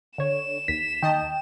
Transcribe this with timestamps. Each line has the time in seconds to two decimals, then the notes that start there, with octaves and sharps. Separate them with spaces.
0.18 D3 C#5 E7
0.68 D#2 B6
1.03 D#3 D#5 G5 A5